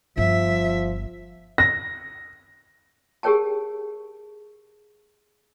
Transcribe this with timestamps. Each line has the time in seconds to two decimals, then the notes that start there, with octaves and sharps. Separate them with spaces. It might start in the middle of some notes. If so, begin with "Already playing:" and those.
0.17 G1 F3 E5
1.58 A#6
3.23 G4 G#4 A#4 C#5 G5 A5